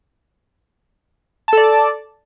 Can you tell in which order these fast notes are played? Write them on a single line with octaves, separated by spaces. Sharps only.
A5 A4 D5